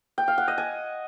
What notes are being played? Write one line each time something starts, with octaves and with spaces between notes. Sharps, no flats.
G5
F5
F#5
D#5
G#5